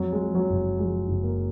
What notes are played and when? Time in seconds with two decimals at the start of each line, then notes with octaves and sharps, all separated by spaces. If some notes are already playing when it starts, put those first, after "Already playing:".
Already playing: F2 F#3
0.13 G#3
0.20 F3
0.35 F#3
0.50 F#1
0.79 F3 G#3
1.08 F#1
1.23 A#3